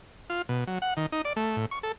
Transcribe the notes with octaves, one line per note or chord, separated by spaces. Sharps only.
F4
B2
F#3
F#5
D#3
D#4
D5
A3
A2
C#6
A4